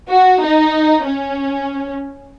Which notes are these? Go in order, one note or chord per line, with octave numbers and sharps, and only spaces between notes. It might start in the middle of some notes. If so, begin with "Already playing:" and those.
F#4
D#4
C#4